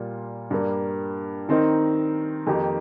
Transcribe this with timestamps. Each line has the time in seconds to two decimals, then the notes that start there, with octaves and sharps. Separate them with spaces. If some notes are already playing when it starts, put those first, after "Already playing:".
Already playing: A#2 G3 A#3 F4
0.51 G2 G3 A#3
1.49 D#3 C4 D#4 A#4
2.47 F2 D#3 A#3 D#4 G4